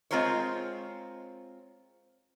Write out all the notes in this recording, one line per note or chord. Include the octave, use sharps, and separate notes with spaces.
G#3 C4 F4 A#4 C5 C#5